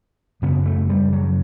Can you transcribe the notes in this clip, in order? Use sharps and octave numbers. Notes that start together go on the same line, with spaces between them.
F#2 C#3 B3
A3
G3
F#3